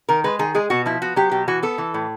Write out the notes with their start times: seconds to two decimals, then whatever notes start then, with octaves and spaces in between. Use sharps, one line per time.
0.09 D#3 A#4
0.24 G#3 B4
0.39 D#3 G#4
0.55 G#3 G#4
0.70 B2 F#4
0.86 F3 E4
1.02 B3 F#4
1.16 F#3 G4
1.31 B2 G4
1.48 E3 F#4
1.63 B3 A4
1.78 E3
1.94 A2